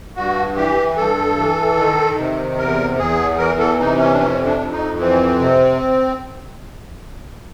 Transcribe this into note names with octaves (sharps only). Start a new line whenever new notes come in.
G2 F#4
E3 G4
G2 A4
E3
D#3
C3
E2 A#4
E2 G#4
E3 A#4
A4
C3 D#4
C#4
D4
F2 C#4
D4
F2
D#4
E3 C4
C3